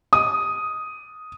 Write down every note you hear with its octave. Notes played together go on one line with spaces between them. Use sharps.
D#6